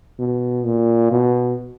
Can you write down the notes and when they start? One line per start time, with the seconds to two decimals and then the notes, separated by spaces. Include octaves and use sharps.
0.19 B2
0.65 A#2
1.12 B2